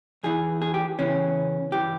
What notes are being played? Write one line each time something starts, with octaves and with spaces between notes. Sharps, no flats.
E2 E3 G#4
G#4
G4
E2 C#3 E3 C#4
G2 E3 G4